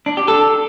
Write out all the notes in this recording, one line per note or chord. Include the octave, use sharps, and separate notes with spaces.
D4
G4
A4